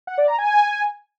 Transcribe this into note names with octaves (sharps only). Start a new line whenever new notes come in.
F#5
D5
A#5
G#5